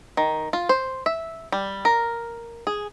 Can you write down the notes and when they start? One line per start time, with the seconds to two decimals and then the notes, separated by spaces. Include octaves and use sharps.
0.17 D#3
0.53 F4
0.69 C5
1.06 E5
1.52 G3
1.85 A#4
2.67 G#4